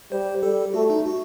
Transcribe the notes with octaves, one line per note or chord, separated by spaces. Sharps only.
G3 C5
G3 A4
A3 F#4
D#4
F#4